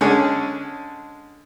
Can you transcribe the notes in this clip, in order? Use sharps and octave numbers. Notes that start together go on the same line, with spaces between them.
D3 G#3 C#4 G#4 A4 C#5